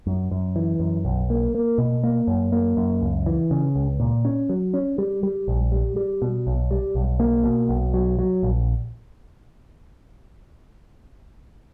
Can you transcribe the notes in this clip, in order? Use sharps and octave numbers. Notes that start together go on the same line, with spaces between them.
F#2
F#2
E3
F#2
B1
A#3
A#3
B2
A#3
F#2
A#3
F#2
C#2
E3
C#3
C#2
A#2
C#4
F#3
C#4
G3
G3
A#1
G3
G3
B2
B1
G3
B1
A#3
B2
B1
F#3
F#3
A#1